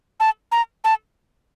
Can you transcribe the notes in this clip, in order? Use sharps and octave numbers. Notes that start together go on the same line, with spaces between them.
A5
A#5
A5